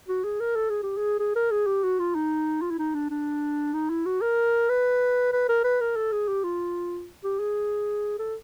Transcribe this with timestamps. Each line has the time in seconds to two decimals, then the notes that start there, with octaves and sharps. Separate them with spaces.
0.09 F#4
0.24 G#4
0.40 A#4
0.56 A4
0.70 G#4
0.83 G4
0.97 G#4
1.19 G#4
1.36 A#4
1.51 G#4
1.67 G4
1.84 F#4
1.99 F4
2.15 D#4
2.62 F4
2.71 E4
2.79 D#4
2.94 D4
3.11 D4
3.74 D#4
3.90 E4
4.06 F#4
4.22 A#4
4.69 B4
5.33 B4
5.49 A#4
5.64 B4
5.81 A#4
5.97 A4
6.12 G#4
6.28 G4
6.44 F4
7.24 G4
7.40 G#4
8.19 A4